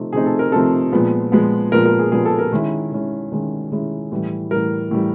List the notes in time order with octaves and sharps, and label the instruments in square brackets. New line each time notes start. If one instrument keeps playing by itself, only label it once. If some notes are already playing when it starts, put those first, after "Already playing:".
Already playing: [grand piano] C3 F3 A3 C4 D#4
C3 F3 A3 C4 D#4 G#4
A4
A#4
C3 F3 A3 C4 D#4 A4
A#2 F3 G#3 B3
A#2 F3 G#3 B3
A#2 F3 G#3 B3 A#4
A#4
G#4
A#2 F3 G#3 B3 G#4
A4
A#4
D#3 G#3 C#4 E4
D#3 G#3 C#4 E4
D#3 G#3 C#4 E4
D#3 G#3 C#4 E4
A2 E3 G3
A2 E3 G3 A#4
A2 E3 G3